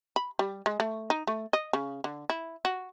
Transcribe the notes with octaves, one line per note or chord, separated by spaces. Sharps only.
B5
G3
G#3
A3
D#4
A3
D#5
C#3
D3
E4
F#4